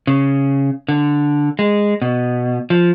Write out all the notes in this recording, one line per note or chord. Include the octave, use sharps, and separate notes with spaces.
C#3
D3
G#3
B2
F3